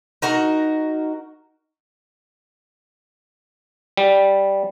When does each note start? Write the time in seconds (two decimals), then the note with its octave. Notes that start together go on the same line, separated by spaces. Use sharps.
0.22 D#4 F#4 A#4
3.97 G3